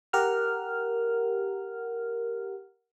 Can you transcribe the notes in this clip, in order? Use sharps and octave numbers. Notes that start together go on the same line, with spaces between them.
G4 A#4 F#5 F6